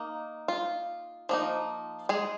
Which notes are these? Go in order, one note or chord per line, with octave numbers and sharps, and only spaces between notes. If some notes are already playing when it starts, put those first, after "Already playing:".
Already playing: A#3 D#4
F4
F3 A#3 D#4
G#3 G#4